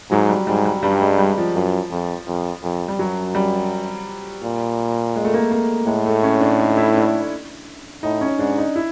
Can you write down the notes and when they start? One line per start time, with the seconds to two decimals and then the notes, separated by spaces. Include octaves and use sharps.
0.11 G#2 F#3
0.29 G3
0.47 G#2 G3
0.66 G3
0.83 G2 G3
1.01 G#3
1.19 G3
1.38 F3
1.55 F#2
1.91 F2
2.27 F2
2.63 F2
2.88 G3
2.99 F#2 F#3
3.35 G3
4.44 A#2
5.16 G#3
5.25 A3
5.34 A#3
5.51 A#3
5.87 A2 G#3
6.06 A3
6.23 C#4
6.41 D4
6.59 D#4
6.77 E4
6.96 D4
8.03 A2 D#4
8.21 C#4
8.39 G#2 D4
8.58 D#4
8.76 E4